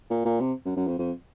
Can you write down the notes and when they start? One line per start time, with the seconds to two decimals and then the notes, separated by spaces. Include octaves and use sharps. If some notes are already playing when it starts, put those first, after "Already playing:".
0.10 A#2
0.25 A#2
0.40 C3
0.65 F#2
0.77 F#2
0.88 F2
0.99 F2